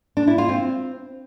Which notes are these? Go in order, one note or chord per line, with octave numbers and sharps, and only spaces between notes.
D4
E4
F4
C4